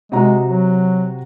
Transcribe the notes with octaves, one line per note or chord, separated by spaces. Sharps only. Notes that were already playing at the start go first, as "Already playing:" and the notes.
C3 G#3 F#4 A#5
F#3